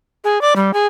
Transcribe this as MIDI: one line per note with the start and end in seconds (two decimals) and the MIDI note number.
0.24 0.41 68
0.41 0.54 74
0.56 0.71 55
0.74 0.87 68